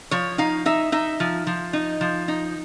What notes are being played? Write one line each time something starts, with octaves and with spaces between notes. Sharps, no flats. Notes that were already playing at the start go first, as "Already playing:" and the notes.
F3 C#5
D#4 F5
D#4 E5
D#4 E5
F3
F3
D#4
F3
D#4